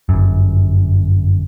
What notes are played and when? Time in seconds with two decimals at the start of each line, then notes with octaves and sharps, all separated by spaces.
0.09 G1 F#2